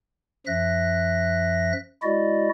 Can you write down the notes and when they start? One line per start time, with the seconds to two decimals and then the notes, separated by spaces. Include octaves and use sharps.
0.46 F#2 F3 E5 F#6 A#6
2.03 G#3 E4 F#4 D5 D#5